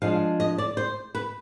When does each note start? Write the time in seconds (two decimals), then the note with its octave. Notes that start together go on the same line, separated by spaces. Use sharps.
0.02 F3 G#3 D4 F5
0.40 D#5
0.58 D5
0.77 C5
1.15 B4